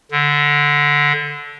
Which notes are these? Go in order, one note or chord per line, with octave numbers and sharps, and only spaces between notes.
D3